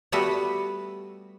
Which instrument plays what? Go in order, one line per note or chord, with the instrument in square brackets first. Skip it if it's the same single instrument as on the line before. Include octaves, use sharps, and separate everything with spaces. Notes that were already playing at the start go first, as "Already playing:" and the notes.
[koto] G3 A3 B3 F#4 B4